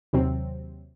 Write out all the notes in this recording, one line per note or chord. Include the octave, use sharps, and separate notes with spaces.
D#2 C3 F#3 C4